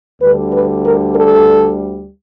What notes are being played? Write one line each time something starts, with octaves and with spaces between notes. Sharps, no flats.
D2 D3 G3 B4
B4
A#4
A4